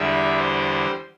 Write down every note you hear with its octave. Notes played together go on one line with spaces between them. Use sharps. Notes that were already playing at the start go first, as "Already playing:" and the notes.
Already playing: E2 D3 G3 E5
C5